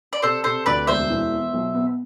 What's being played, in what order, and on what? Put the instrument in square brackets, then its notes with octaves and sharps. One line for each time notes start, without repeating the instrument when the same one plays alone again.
[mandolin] D5
[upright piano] C3 [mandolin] A4 C5
[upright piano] C3 [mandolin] A4 C5
[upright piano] D2 [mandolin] B4 D5
[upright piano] E1 [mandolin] C5 E5
[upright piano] E3
B3
B1
B3